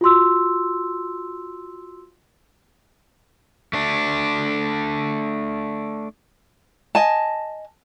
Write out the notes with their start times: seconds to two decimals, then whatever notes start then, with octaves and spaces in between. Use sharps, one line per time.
0.01 F4 F#4 C6 E6
3.73 A3 D4
6.95 D#5 G#5 A5